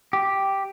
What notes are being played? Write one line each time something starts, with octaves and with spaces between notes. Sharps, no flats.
G4